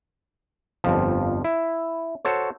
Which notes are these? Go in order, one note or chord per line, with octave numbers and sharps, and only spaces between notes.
G1 F2 F3
E4
F#4 A4 C5 C#5